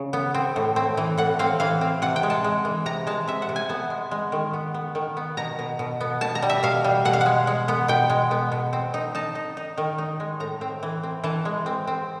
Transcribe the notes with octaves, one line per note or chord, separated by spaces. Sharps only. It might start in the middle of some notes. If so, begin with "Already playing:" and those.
Already playing: C#3
B3
C4
A2
C4
E3
A2 F#5
C4 F5
E3 F5
C4
C3 F#5
G5
G#3
A5
G#3
E3
C3 A#5
G#3 A5
C3 E5
F#5
C3
G#5
B3 A5
G#3
G#3
D#3
B3
B3
D#3
B3
B2 A#5
B2
B2
B3
B2 A5
A#5
G3
E5
B2 F5
G3
B2 F#5
F5
F#5
G#3
G#3
B3
B2 G5
G#3
B3
B2
C4
D#4
D#4 A5
D#4
D#4
D#3
D#4
G#3
A2 A#5
C4
E3
C4
E3 A5
G#3
C4
C4